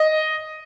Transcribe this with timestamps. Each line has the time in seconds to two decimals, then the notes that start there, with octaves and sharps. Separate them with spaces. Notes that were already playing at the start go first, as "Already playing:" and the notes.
Already playing: D#5